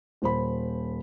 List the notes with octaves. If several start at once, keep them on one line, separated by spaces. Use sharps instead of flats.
D#1 C5 B5